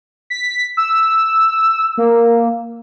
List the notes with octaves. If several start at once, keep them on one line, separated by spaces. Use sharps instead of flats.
B6
E6
A#3